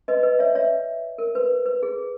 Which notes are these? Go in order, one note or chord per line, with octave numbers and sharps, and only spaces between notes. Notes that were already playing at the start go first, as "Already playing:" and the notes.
B4 D#5
B4 D#5
C#5 E5
C#5 E5
A#4
B4
B4
B4
G#4